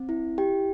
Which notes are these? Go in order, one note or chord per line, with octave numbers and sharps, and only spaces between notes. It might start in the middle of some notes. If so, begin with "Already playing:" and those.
Already playing: C4
E4
G4 G5